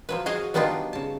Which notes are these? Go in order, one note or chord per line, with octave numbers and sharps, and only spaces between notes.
F3 F#3 B4
F#4 G#4 D#5 F5
F#3 G3 B3 D4 D#4 F4
C#3 A5